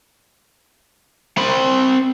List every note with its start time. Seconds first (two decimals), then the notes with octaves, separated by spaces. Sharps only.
1.38 C4 B5